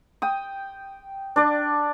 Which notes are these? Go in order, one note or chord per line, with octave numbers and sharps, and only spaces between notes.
G5 D#6
D4 D5